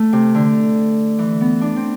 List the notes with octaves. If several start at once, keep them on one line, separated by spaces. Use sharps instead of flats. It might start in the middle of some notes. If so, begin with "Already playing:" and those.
Already playing: A3
C3
D3
E3
B3
D4
C4